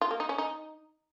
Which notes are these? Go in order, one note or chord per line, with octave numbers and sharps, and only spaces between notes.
F4
A#3
D#4
C#4
D#4